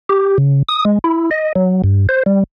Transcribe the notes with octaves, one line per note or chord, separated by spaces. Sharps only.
G4
C#3
D#6
G#3
E4
D#5
F#3
G2
C5
G3